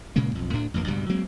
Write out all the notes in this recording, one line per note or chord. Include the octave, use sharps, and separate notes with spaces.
A#2 C#3 G#3 A#3
B1 F2
D2 A2 D4
A1 F2 E3 A#3
C#2 G2 B2 G3
F#3 G#3 A#3 C4